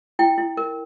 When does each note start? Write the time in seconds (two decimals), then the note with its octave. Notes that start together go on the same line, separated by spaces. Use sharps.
0.19 E4 G5
0.38 E4
0.57 A#4